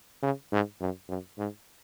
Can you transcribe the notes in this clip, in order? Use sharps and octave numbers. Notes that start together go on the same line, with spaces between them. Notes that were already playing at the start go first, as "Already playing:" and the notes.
C#3
G#2
F#2
F#2
G#2